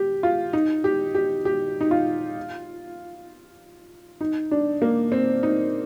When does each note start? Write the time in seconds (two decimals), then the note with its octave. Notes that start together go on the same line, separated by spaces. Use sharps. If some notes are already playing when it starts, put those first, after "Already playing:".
Already playing: G4
0.23 F4
0.53 D#4
0.84 G4
1.15 G4
1.45 G4
1.81 D#4
1.91 F4
4.21 D#4
4.51 D4
4.82 A#3
5.12 C4
5.43 D#4